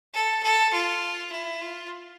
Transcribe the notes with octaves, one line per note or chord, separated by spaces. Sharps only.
A4
A4
F4
E4
F4